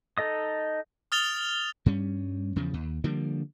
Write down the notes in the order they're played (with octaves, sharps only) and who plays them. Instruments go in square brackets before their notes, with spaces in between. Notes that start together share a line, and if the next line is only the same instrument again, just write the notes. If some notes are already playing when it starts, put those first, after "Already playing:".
[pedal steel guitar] D#4 A4 D#5 D#6
[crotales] D#6 F6 A6 F7 G7
[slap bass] G2 G3 C#4
E2 C#3 F3
D#2
D3 F3 G3 A#3